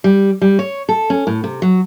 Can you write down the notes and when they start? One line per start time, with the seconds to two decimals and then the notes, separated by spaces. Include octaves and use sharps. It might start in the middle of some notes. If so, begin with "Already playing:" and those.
0.04 G3
0.42 G3
0.59 C#5
0.89 A4
1.10 C#4
1.27 A2
1.44 C3
1.62 F#3